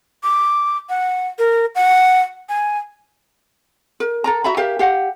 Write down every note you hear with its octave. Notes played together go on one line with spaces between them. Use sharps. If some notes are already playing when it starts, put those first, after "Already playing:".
D6
F#5
A#4
F#5
G#5
A#4
A4 A#4 A#5
F#4 E5 A#5 B5
G4 A#4 E5 F5
G4 F5 F#5